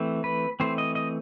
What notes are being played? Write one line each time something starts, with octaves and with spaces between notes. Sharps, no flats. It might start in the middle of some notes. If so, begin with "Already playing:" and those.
Already playing: E3 A3 C4
B4
E3 A3 C4 C5
D#5
D#5